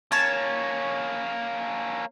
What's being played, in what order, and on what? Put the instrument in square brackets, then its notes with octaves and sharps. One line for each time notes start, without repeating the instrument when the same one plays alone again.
[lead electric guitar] A#3 C#4 [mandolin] C#5 A5